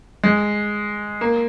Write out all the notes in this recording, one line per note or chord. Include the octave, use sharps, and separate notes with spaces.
G#3
A#3